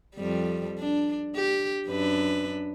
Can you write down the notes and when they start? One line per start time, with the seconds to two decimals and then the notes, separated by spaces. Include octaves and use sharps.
0.15 F2 G3
0.79 D4
1.36 G4
1.87 F#2 D4 B4